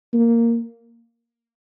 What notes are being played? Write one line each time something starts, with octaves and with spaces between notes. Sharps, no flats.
A#3